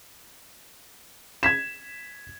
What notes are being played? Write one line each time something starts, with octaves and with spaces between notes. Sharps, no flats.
G#6 B6 E7